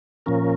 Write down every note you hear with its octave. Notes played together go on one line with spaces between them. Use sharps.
A#2 F3 C#4 A#4